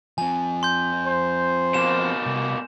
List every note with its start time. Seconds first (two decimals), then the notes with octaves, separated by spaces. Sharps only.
0.18 F3 C4 G#5
0.63 C6 G6
1.06 C5
1.74 B2 A#3 E7
2.26 C2